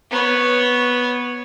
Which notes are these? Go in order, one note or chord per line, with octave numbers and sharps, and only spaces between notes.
B3 C#5